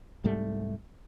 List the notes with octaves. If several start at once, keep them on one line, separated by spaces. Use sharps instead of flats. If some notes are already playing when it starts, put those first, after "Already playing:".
C2 G#2 G3 A3